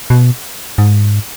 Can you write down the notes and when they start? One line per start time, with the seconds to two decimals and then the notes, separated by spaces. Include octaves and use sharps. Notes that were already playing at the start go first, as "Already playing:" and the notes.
0.10 B2
0.78 G#2